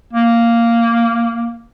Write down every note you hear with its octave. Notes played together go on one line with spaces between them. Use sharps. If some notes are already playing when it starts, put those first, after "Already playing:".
A#3